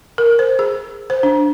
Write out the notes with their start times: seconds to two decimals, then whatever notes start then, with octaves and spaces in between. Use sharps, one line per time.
0.18 A#4
0.39 C5
0.59 G#4
1.10 C5
1.23 D4